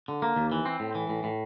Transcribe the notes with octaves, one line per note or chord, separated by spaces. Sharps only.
D3
A#3
D#2
E3
C4
A2
E3
A2
A2